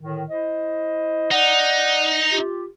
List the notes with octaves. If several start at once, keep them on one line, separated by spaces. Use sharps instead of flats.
A2 D3 D#3
E4 C5 D#5
D#4 D5 F#5
F4 G4